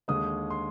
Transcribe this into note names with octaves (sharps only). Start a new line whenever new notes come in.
D#2 D3 G#3 D#6
C6